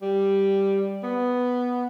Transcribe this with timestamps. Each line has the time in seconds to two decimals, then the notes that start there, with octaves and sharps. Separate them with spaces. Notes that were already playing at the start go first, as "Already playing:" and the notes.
0.02 G3
1.03 B3